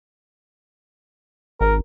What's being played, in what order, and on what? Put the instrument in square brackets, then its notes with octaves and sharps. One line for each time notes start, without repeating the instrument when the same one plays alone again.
[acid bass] G#1 [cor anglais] A#4